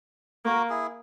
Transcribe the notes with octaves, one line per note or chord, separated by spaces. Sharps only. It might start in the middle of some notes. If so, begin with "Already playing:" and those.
A#3 F#4 A#4
E4 G#4